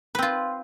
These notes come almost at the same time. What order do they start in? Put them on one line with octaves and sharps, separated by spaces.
B4 C4 F4